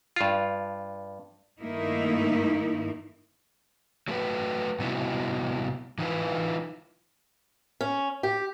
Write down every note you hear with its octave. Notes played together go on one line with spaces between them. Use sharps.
G2 F4
G2 D#3 A3 A#3 D#4 E4
F#3 A3 F#4 A4 B4
C3 G3 B3 D#4 E4 F#4
E3 D#4 F4 B4
C#4
G4